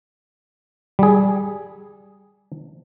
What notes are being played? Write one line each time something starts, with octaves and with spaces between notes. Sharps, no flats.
G3 G#4